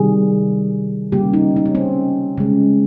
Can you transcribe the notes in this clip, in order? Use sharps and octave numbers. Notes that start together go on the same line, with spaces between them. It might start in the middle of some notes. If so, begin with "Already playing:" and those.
Already playing: C3 D#3 G3 G#4
C#3 G3 A#3 G4
D#4
D#4
C#4
C4
C#3 G#3